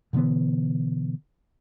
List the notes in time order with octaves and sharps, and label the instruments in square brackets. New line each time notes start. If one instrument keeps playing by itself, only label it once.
[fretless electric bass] B2 D3 E3 B3